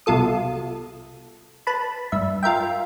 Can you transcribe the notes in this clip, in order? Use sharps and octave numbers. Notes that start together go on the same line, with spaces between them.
C2 B2 F4 A4 D#6
B4 A5 B5
G2 E5
F4 A#4 E5 G5